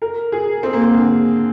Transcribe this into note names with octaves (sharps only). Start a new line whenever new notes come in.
A#4
G#4
C4
A#3
C4
D3